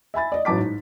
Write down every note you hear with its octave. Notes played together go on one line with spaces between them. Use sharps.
E5 G#5 B5 A6
D5 D#5
A1 F#3 A5 D6 B6
G#2